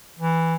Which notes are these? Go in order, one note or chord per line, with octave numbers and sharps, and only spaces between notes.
E3